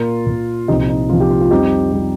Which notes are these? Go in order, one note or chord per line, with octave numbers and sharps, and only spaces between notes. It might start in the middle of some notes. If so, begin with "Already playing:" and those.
Already playing: A#2 A#3 F4 A#4
A#2 A#3
C2 A#2 F3 C4 D#4 G4
D#4
C2 A#2 F3 C4 F4
G4
F4
F4
F2 C3 G3 C4 D#4 G4
C3 G3 C4